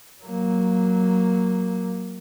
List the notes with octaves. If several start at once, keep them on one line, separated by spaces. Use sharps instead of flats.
F#3 A#3